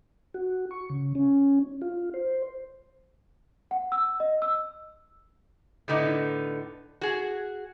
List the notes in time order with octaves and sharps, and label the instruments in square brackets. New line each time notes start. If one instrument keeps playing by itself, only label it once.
[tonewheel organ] F#4
C#6
C#3
C#4
F4
C5
[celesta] F#5
E6
D#5
E6
[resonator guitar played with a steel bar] A2 D3 B3 D#4
F#4 G#4